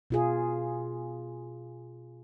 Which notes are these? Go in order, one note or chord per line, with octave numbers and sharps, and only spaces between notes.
B2 F4 G#4